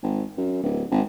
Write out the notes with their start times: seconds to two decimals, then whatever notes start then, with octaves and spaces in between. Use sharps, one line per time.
0.03 G#1
0.38 F#2
0.63 D1
0.91 G#1